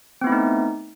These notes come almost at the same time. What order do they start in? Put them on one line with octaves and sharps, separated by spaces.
C4 B3 E4 A3 D#4